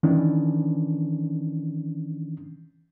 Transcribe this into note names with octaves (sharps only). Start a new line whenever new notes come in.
D#3 E3 C#4 D4